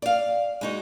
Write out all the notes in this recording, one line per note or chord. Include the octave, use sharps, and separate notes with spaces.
D5 F5
G#3 D#4 F#4